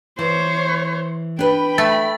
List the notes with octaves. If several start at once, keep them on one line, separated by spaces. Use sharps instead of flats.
E3 C5 C#5
D4 B4 G5 B5
A3 A6